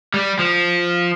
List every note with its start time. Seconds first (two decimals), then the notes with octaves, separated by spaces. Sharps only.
0.14 G3
0.39 F3